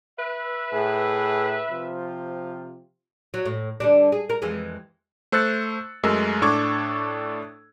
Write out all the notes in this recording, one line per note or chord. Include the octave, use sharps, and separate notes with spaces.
B4 E5
A2 G#4
C3 F3 F4
F#3
A2
D3 G3 D4
G#4
A#4
F2 E3 G#3
A3 C5 E6 F#6 A6 C#7
F#2 G#3 A3 A#4 E6
A2 D4 A4 C#6 D6 G#6